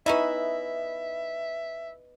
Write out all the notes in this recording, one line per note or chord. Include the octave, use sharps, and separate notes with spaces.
C#4 D#4 E4 B4 D#5 E5